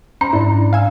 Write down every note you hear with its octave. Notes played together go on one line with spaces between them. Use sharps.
C#4 C5 A#5
G#2 D4 E4
F5 G#5 E6